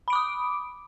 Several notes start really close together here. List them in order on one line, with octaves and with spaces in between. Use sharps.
B5 D7 D6 D#6